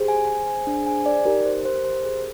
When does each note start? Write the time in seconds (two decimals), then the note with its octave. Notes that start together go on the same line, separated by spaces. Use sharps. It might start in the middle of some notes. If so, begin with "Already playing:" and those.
Already playing: G4 G#4 C5
0.08 G#5
0.27 G#5
0.47 G#5
0.67 D4
0.87 G#5
1.06 D5
1.25 D#4 G4 A#4
1.46 C5
1.65 C5
1.85 C5
2.04 G#4